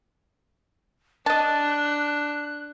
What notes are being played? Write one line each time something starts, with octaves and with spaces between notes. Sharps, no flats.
D4 D#5 A5 F#6